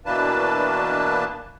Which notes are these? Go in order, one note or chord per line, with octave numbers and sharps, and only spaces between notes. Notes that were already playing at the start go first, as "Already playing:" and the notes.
B2 E3 A#3 D4 B4 A5